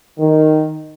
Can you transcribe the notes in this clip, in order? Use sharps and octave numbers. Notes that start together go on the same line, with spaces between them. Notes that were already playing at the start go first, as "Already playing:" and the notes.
D#3